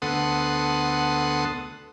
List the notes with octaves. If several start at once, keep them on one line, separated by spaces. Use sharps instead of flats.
D2 B3 A4 F#5 C6 D#6